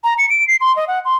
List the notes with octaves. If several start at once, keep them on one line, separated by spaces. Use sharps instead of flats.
A#5
C#7
D7
C7
C6
D#5
F#5
C6